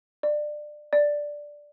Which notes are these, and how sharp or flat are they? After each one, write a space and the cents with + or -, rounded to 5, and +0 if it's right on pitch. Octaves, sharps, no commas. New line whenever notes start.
D5 +25
D5 +0